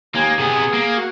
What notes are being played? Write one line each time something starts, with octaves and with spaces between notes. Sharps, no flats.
D#2 G#3 A#3 G#5
C3 B3 G#4
A#3
F#4